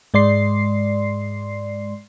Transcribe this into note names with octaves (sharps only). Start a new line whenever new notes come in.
G#2 G#3 D5 C6 C7